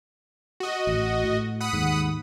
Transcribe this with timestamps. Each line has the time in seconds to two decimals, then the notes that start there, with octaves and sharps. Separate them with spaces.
0.60 F#4 D#5
0.87 A1
1.24 A2
1.61 F#5 B5 D#6
1.73 D#2 G#2